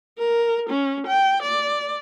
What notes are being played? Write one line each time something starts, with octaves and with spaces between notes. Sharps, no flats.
A#4
C#4
G5
D5